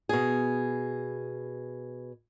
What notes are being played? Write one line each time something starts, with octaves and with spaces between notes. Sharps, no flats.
B2 G#4